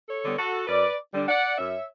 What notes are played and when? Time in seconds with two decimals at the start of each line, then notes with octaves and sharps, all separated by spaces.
0.08 A4 C#5
0.23 D3 G3 B3
0.37 F#4 A4
0.67 F#2 B4 D5
1.13 D3 G3 D4
1.28 D5 F#5
1.57 F#2 C#5 E5